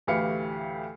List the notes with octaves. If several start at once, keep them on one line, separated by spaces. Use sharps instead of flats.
D2 A2 E3 G4 F5 C#7